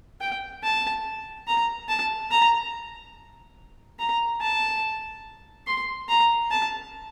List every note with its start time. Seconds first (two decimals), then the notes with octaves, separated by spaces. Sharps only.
0.21 G5
0.64 A5
1.48 A#5
1.89 A5
2.31 A#5
3.99 A#5
4.42 A5
5.67 C6
6.09 A#5
6.52 A5